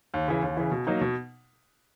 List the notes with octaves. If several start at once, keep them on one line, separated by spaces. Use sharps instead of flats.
D#2
C#3 E3
D#2
C#3 E3
B2
F#3 A#3 D#4
B2